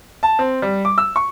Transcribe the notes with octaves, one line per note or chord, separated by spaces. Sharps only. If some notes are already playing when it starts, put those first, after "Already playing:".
A5
C4
G3
D6
E6
C#6